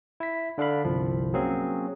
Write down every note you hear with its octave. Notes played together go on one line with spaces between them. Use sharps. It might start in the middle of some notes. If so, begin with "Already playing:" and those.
E4 B6
D3 D4 A4 F5 B5
G1 C2 F3
F#3 A#3 C4 C#4 G#4